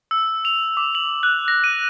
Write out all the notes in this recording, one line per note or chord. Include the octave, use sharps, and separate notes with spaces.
E6
F7
D6
F#7
F#6
A#6
D#7